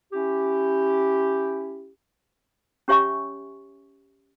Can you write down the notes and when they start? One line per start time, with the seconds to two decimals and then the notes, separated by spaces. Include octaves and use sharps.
0.13 C#4 E4 G4
2.88 C#4 G4 C#5 E5 G#5 C#6